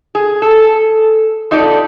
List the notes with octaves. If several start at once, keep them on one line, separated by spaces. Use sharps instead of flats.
G#4
A4
F2 D#4 G4 A4 D5